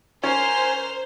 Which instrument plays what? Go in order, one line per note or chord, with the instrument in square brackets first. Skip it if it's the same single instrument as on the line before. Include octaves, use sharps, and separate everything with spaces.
[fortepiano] C#4 [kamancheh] A#4 F6 [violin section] C5 [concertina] G#5